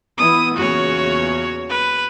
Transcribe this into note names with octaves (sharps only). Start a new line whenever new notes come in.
E3 B3 E4 D#6
E2 A#2 C#3 F#4 C#5
B4